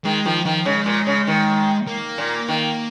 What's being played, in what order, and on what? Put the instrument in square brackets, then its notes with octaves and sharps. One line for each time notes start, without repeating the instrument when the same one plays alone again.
[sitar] D#3 [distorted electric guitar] G#3
[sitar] D#3 [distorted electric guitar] F3
[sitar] D#3 [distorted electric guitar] F3
[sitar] C#3 [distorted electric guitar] G#3
[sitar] A#2
C#3
D#3
[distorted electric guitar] A#3
[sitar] A#2
D#3